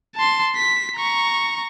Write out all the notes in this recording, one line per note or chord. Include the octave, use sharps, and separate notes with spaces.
A5 C6
B6
A#5 C#6